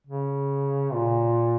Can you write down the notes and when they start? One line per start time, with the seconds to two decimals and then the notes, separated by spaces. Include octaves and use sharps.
0.07 C#3
0.93 A#2